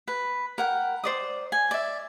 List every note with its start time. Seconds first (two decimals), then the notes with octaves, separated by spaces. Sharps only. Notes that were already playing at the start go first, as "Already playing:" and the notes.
0.08 B4
0.58 A#4 F#5 G5
1.04 C5 D5 D#6
1.52 G#5
1.71 D5 E5